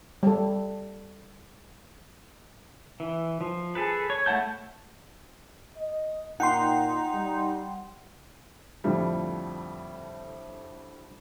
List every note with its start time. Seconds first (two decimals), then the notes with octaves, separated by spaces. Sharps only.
0.23 G3 A4
3.00 E3
3.41 F3
3.75 G#4 A4 B4
4.10 C#5
4.26 A3 E4 F#5 A5 G6
5.77 D#5
6.40 A#2 D#4 F#5 G5 C6
7.14 G3
8.84 F2 A2 D3 F3 G3